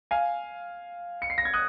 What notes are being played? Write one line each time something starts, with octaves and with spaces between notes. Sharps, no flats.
F5 G#5
C#7
C7
A#6
G#6
D#6 F#6